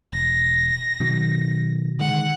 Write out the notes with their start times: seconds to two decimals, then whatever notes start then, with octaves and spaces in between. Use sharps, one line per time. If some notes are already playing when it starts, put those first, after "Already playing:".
0.13 E1 A#6
1.00 B2 D#3 F#3
1.99 D3 D#3 G#3 F#5